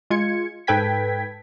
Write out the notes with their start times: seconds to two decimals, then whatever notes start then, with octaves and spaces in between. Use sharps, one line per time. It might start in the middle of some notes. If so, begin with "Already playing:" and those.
0.10 G#3 F4 G#6 C#7
0.67 G#2 A4 B4 G5 G#6 B6